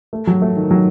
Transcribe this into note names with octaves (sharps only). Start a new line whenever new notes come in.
A3
F#3
A3
D#3
F#3